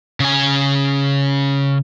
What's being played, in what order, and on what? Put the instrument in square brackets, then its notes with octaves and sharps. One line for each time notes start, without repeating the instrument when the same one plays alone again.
[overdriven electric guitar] C#3 G#5